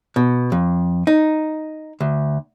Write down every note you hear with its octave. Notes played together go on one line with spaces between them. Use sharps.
B2
F2
D#4
D2